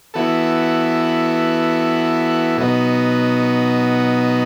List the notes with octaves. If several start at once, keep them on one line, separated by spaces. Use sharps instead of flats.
E3 B3 F#4 A4
B2 F#3 B3 D#4